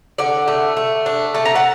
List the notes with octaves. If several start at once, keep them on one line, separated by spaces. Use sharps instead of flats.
D3 D5 F#5
A3
A3
D4
A3 A5
A#5
F#5 A5